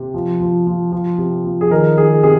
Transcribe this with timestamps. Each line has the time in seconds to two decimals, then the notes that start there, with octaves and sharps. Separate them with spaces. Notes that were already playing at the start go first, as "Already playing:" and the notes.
Already playing: C3
0.14 F3
0.40 F3
0.67 F3
0.92 F3
1.18 C3
1.44 F3
1.61 G#4
1.71 D#3 A#4
1.97 D#3 G#4
2.23 C3 G#4